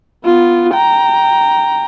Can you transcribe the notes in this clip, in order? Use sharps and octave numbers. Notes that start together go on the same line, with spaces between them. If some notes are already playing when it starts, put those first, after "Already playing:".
B3 F4
G5 A#5